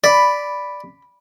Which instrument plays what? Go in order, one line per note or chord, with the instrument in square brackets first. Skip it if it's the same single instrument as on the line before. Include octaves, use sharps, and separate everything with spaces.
[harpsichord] D5 [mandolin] B5